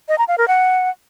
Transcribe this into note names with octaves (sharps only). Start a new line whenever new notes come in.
D#5
A#5
F5
A#4
F#5